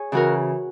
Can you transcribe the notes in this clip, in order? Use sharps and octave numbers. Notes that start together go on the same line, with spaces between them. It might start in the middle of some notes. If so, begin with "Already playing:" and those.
Already playing: G#4 C#5
C#3 E3 F#4 A#4